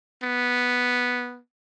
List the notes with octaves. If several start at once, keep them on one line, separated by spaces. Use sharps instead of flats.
B3